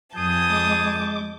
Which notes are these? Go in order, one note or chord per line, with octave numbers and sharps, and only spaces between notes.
F2 G#4 A5 D#6 G6
G#3 D6